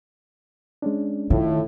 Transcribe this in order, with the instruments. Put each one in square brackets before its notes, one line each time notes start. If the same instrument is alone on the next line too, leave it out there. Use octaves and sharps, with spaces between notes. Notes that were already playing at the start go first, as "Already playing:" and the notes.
[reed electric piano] G#3 C#4 D4
[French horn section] A2 [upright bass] D#3 [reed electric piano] F4